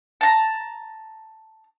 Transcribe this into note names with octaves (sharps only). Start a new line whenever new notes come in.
A5 A#5